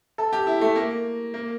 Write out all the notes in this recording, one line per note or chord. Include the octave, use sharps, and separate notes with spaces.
A4
G4
E4
A3
A#3
A#3